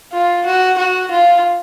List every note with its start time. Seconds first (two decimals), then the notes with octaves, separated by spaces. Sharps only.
0.13 F4
0.46 F#4
0.78 F#4
1.12 F4